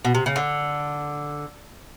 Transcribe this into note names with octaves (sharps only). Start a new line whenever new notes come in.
B2
C3
C#3
D3